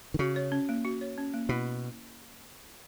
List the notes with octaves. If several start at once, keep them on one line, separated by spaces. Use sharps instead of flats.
D#3
C#3 F#4
C#5
C#4
A#3
F#4
C#5
C#4
A#3
B2 E4